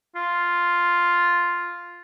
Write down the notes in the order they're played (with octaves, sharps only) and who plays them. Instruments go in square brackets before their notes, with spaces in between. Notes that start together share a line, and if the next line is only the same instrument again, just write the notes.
[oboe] F4